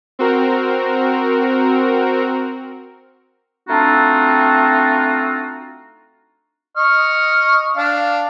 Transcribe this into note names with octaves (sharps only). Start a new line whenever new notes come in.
C4 F#4 A#4
A3 C4 D4 D#4 F4 F#4
D#5 C#6 F6
D4 F5